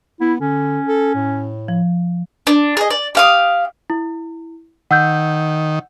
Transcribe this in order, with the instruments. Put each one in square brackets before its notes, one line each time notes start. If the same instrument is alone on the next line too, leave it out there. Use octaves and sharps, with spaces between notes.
[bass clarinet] B3 [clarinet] E4
[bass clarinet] D3 [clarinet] C#4
[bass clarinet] A4
A2
[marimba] F3
[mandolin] D4
G#4 D#5
D5
G4 F5 D#6
[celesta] E4
[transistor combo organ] D#3 [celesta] F#5 E6 G6